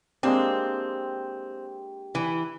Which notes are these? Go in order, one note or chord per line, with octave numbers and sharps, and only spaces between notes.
G#3 A#3 C4 D4 G4 G5
E3